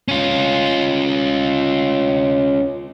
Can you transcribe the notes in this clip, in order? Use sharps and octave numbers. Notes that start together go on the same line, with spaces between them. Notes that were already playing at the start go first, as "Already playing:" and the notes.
C#4 F4